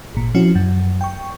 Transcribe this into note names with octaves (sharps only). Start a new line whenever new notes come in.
G#1 A#2
F3 C4 C#4 E4 F#4
F#2
G5 C#6